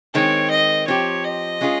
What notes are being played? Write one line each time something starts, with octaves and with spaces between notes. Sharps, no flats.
D#3 G#3 C4 C#5
D#5
F3 C4 G4 C#5
D#5
G#3 C#4 F4 G#4